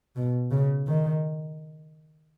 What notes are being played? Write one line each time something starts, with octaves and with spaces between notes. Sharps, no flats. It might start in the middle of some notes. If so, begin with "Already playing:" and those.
B2
C#3
D#3